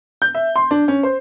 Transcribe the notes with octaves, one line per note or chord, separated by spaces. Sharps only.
G6
E5
C6
D4
C#4
C5